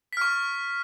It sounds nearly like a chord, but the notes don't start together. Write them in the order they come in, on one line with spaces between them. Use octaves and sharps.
B6 F6 C#6